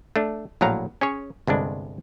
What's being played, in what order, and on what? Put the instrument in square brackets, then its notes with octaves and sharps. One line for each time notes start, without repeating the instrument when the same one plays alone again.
[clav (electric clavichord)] A3 D4
A#1 A2 F#3 F5 A#5
C#4 G#4 C#5
G1 C2 G#3 D4